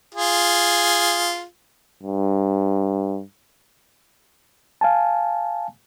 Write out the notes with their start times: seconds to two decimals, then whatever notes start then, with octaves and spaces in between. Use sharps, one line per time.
0.14 F4 G#4
2.03 G2
4.81 F5 G#5 A5